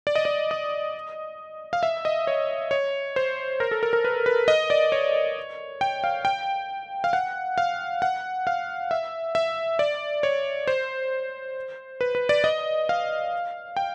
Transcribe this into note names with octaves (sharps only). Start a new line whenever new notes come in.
D5
D#5
D5
D#5
F5
E5
D#5
C#5
C#5
C5
A#4
A4
A#4
A#4
B4
B4
D#5
D5
C#5
G5
F5
G5
F5
F#5
F5
F#5
F5
E5
E5
D5
C#5
C5
B4
B4
D5
D#5
F5
G5